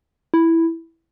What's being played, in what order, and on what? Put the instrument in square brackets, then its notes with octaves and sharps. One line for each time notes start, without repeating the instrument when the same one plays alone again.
[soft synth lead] E4